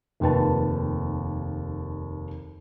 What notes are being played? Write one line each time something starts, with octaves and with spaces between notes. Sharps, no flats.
F1 D#2 B4 A5